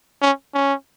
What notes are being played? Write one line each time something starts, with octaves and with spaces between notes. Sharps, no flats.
C#4
C#4